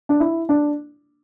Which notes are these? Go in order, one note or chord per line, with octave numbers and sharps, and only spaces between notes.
D4
E4
D4